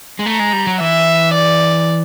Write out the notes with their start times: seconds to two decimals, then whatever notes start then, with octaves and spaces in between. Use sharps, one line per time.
0.19 G#3
0.26 A3 A#5
0.40 G#3
0.53 G3
0.67 F#3
0.80 E3 E5
1.34 D5